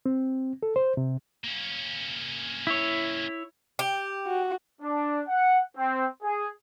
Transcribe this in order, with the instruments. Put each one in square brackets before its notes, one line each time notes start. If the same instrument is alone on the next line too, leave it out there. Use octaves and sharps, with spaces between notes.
[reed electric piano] C4
A4
C5
C3
[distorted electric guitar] A#3 C#4
[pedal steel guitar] E4 C#5
[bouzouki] G4
[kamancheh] F#4
[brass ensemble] D4
F#5
C4
G#4